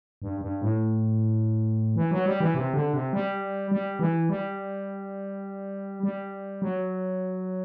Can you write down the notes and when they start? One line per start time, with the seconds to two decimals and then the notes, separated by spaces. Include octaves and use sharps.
0.22 G2
0.41 G2
0.62 A2
1.96 E3
2.11 F#3
2.26 G3
2.40 E3
2.55 C3
2.74 D3
2.93 C3
3.13 G3
3.71 G3
3.99 E3
4.29 G3
6.03 G3
6.62 F#3